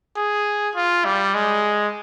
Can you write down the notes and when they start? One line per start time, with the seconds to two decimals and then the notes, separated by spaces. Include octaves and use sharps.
0.16 G#4
0.75 F4
1.05 G3
1.34 G#3